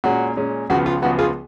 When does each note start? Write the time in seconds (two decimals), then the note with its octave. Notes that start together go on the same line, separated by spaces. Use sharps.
0.04 A#2 G#3 C#4 F#4
0.37 A#2 G#3 C#4
0.70 C#2 C#3 F3 B3 F#4
0.86 F4
1.02 C#2 C#3 F3 B3 F#4
1.19 F4 G#4